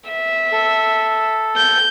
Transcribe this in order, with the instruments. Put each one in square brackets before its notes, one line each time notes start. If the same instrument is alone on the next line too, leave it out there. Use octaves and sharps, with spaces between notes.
[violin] E5
[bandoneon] A4
[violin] G6